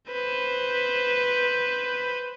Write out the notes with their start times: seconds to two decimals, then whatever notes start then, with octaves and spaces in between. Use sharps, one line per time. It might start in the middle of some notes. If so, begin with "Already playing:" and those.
0.12 B4 C5